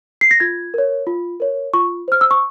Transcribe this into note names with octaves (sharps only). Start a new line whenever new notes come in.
C7
A#6
F4 G#6
A#4 C#5
F4
A#4 C#5
F4 C#6
C5 F6
E6
C#6